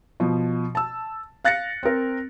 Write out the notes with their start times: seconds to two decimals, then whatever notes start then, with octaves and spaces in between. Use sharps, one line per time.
0.20 B2 F3
0.75 A5 E6
1.45 F5 F#6 A6 A#6 C#7
1.83 C4 A#4